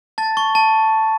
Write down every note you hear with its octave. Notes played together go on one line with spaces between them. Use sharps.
A5 A6
C#6
A5